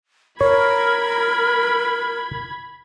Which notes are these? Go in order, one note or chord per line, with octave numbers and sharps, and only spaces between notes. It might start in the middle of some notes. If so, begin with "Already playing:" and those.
A#4 C#5 B5 G#6